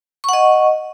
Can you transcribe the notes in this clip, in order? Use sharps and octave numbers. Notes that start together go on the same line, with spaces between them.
D#5 F#5 C#6